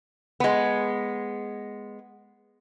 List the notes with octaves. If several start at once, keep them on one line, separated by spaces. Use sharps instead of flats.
G#3 B3